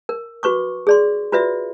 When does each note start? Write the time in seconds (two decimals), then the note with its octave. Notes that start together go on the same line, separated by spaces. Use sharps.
0.09 A#4
0.43 F#4 B4 C#6 D6
0.87 G#4 D5 C6
1.32 F4 F#4 B4 D5 E5